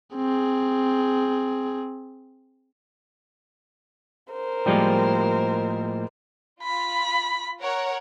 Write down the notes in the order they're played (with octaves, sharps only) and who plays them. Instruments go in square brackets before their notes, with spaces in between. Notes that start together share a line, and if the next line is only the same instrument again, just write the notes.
[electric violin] C4 G#4
[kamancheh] A#4 C5
[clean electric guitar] A2 F3 A#3 [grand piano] G3 G#3
[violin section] F4 [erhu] B5
[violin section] A#4 C#5 F#5